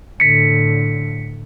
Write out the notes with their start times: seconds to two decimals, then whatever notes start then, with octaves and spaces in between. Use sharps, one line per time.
0.20 A2 D3 B6 C#7